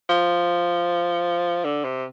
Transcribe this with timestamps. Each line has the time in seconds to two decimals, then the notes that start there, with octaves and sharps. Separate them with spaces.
0.10 F3
1.65 D3
1.84 C3